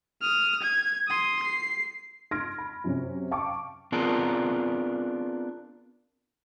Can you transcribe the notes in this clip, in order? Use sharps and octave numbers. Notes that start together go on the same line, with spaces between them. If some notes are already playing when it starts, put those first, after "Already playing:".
D#6 F6
G#6
C6 D#6
C7
C6 F6 G#6 A#6 D7
B5
F#2 C3 C#4
F5 G5 A5 C#6 D6
B3 C4 D4 F4 G#4 A#4